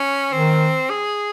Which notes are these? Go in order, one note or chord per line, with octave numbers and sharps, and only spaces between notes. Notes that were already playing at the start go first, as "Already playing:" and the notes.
Already playing: C#4
D#3 C4
G#4